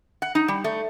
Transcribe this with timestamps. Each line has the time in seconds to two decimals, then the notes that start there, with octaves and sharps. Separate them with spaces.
0.22 F#5
0.35 D#4
0.48 G3
0.64 A3